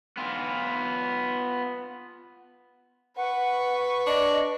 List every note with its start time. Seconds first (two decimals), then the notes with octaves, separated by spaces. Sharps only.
0.17 B3 F4
3.17 B4 F#5 C#6
4.07 D4 D#5